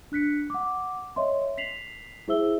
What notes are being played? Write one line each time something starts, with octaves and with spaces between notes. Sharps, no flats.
D4 F#6 B6 C#7
F#5 D6
C#5 D#5 E5 C6
B6 C7 F7 F#7
E4 G#4 C5 E5 E6 G7